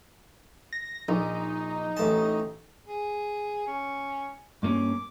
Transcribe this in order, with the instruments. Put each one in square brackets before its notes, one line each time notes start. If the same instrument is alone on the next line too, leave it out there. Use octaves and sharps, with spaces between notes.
[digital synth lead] A#6
[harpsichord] A#1 [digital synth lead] D#4
[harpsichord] A1 A5
[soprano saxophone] G#4
C#4
[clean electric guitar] G2 A#3 C#4 [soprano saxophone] D6